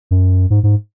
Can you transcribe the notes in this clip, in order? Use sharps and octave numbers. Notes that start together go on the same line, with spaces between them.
F#2
G#2
G#2